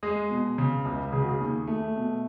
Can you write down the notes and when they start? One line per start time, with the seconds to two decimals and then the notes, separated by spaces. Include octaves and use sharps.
0.03 G#3 G#4
0.30 B2
0.58 C#3
0.85 C#2
1.12 C#3 G#4
1.21 F#4
1.29 G#4
1.40 D#2
1.67 A3
1.96 B2